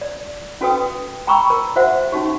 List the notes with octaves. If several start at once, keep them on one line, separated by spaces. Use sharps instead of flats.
D5
C#4 F#4 A4 B4 G5 D#6
G5 A#5 B5 C#6 D6 E6
A#4
F#4 C5 E5 F#5
C#4 D#4 F#4 G4